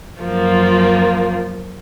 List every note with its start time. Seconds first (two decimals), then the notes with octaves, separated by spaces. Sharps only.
0.22 F#2 F3 A#3 F4